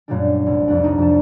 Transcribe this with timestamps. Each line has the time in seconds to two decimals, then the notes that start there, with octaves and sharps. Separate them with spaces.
0.08 F#2 A#2 F#3 G3 A3 D4
0.46 C2
0.68 F2 D4
0.84 D4 D#4
0.98 F2 A5